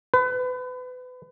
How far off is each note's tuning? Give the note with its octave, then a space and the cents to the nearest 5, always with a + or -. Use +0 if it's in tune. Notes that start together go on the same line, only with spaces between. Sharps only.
B4 +30